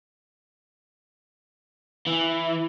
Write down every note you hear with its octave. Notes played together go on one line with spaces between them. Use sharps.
E3